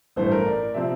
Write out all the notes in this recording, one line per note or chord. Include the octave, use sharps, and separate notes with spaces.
A1 G2 E3 A3 C5
A#4
D5
C3 F3 C4 E5